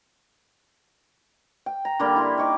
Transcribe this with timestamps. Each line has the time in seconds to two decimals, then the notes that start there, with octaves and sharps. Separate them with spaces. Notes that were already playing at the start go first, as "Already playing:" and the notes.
1.66 G5
1.85 A#5
1.99 D3 G3 A#3 G4
2.16 E4 C6
2.38 D#4 C#6 D6